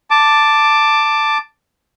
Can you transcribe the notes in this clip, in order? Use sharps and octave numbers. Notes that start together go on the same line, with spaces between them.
A5 D6